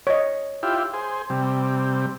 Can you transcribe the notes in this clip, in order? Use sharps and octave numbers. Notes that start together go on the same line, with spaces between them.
C#5 D#5
E4 F4 G4
G#4 C5
C3 G3